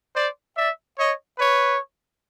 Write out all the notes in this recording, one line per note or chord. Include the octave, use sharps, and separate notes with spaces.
C5 D5
D5 E5
C#5 D#5
B4 C#5